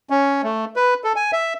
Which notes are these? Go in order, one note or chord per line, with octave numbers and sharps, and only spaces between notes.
C#4
A3
B4
A4
G#5
E5